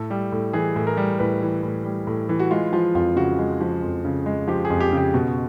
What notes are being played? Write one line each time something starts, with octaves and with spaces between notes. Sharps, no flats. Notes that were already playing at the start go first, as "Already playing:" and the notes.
Already playing: A2 A4
G3
A2
E3 G#4
A2
A#4
G3
A2 B4
E3
A2
G3
A2
E3
F#4
G#3 F4
F3 F4
F2 F4
C#3 F#4
G#3
F3
F2
C#3
G#3
F3 G4
G#4
F2
G4
C#3
G4
B2 F#4